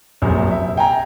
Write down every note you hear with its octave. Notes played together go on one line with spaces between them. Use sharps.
F1 A#1 F#2
E5
G5 G#5 A#5